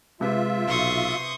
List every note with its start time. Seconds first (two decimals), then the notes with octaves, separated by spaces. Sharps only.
0.21 C3 G#3 F4 B4 E5
0.68 B1 C6 C#6 D#6